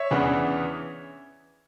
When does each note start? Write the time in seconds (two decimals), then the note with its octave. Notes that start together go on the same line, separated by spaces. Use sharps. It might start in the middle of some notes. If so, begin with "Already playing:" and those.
Already playing: C#5 E5
0.11 E2 C#3 E3 B3 D4